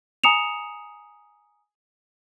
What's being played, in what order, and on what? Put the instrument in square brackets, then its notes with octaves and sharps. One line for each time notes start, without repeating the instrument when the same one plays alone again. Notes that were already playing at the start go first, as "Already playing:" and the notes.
[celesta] G#5 A#5 D#6 C#7 E7 F7